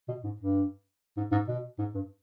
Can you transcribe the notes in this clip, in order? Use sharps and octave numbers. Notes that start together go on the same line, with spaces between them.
B2
G#2
G2
G#2
G#2
B2
G#2
G2